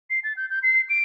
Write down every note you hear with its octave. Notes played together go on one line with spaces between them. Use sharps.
C7
A6
G6
G6
C7
D7